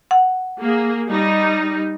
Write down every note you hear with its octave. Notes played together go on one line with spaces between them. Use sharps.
F#5
A#3 G#4
G3 D#4